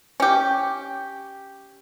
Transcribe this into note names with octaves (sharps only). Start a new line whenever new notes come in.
C#4 G4